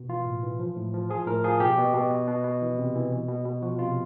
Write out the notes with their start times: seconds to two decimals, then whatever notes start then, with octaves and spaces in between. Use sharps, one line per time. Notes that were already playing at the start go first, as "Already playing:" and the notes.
Already playing: B2
0.09 E3 F4
0.26 A2
0.43 E3
0.60 F3
0.77 A2
0.94 F3
1.10 F3 G#4
1.27 A2 A#4
1.44 F3 G#4
1.60 B2 G4
1.78 B2
1.94 B2
2.11 B2
2.27 B2
2.45 B2
2.62 E3
2.78 C3
2.95 E3
3.13 B2
3.28 B2
3.46 B2
3.62 F3 F#4
3.79 C3 F4